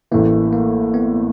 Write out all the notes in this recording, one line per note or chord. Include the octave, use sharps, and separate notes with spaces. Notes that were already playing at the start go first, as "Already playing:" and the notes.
A1 A2 E3 A#3
A#3
B3